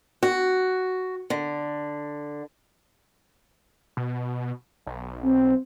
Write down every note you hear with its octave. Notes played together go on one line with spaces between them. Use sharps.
F#4
D3
B2
B1
C4